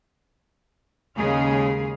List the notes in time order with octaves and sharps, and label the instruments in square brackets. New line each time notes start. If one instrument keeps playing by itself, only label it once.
[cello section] D#2 C#3 G#3 G#4 F5